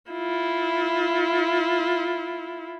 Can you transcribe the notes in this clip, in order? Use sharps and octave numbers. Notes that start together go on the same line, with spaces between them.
E4 F4